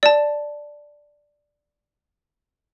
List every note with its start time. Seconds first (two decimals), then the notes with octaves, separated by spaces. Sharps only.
0.03 D5 A5